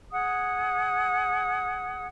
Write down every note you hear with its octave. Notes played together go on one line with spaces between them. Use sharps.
G#4 F#5 D#6